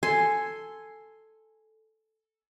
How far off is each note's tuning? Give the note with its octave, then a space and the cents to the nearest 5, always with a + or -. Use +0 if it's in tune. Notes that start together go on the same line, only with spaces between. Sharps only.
A4 +0 G#5 +0 C6 +0